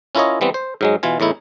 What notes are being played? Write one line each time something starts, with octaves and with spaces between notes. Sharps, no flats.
C#4 E4 F4 A#4 C#5 D#5
E3 G3 B3 C4
C5
G#2 F#3 G#3
B2 E3 F4 G#5
E2 A2 D#4 E4